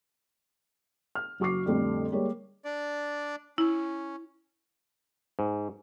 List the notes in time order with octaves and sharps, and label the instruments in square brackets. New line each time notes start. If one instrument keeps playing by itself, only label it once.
[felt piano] F6
F#1 F#4 C#6 D6 C7
F2 A2 D3 G3
G3 G#3 A#3 C#5
[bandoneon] D4 D5
[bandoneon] C#4 [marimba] E4
[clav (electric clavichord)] G#2